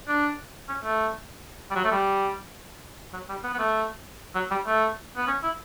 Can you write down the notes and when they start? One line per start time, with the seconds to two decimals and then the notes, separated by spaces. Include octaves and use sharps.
0.08 D4
0.68 C#4
0.84 A3
1.71 G3
1.75 F#3
1.84 A3
1.91 G3
3.13 F#3
3.29 G3
3.44 B3
3.54 B3
3.59 A3
4.35 F#3
4.51 G3
4.67 A3
5.17 B3
5.28 C#4
5.43 E4